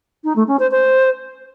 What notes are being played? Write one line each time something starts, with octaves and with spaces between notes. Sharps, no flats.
D#4
A3
C#4
C5
C5